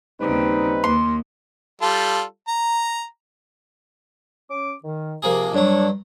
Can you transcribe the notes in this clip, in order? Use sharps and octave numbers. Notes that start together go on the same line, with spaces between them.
D#2 C#3 G3 C4 D#4 B4
D#2 A#3 C6
G3 F4 A4
A#5
C#4 D6
D#3
C3 F3 A#3 G#4
G2 F#3 D4 C#5